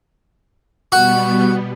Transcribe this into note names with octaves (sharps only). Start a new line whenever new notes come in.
B2 G3 B3 F#4